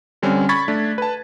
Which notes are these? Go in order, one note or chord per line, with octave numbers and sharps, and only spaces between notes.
D3 G3 C4 C#4
B5 C#6 G#6 A6 B6
A3 D4
B4 A5